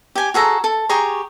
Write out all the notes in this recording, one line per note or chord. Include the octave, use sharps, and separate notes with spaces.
G4 G#5
F#4 G#4 A4 A#5
A4
G4 G#4 A#5 C#6